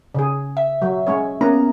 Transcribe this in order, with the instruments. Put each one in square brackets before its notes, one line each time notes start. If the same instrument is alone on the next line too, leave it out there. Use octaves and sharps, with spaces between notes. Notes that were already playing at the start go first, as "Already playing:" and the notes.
[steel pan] C#3 G#4
[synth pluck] E5
[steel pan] F#3
G#3 C#4 C#5
[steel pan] A#3 [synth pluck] B3 C#4 A#5